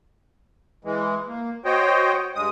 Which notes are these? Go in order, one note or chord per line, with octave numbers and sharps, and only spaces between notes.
E3 G#3
A#3
F#4 C5 C#5 D#5 G5
G2 G#3 D#6